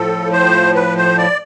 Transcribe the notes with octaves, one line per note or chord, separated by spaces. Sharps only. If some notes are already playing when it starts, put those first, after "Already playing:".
Already playing: A2 F3 A4
C5
B4
C5
D5